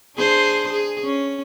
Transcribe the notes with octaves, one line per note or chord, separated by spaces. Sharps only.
D4 G#4 C5
G#4
C#4